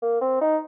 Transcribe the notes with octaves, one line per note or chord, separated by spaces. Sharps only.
A#3
C4
D#4